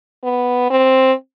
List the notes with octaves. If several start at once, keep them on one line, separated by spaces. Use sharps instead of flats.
B3
C4